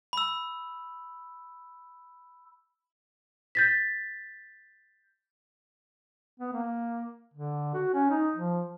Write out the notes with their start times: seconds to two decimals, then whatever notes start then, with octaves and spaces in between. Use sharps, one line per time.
0.13 B5 E6
3.55 G6 A6 B6
6.40 B3
6.53 A#3
7.34 D3
7.74 F#4
7.94 C#4
8.10 D#4
8.36 F3